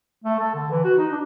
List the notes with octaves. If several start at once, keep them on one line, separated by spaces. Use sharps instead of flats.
A3
A4
D3
E3
F#4
D#4
D4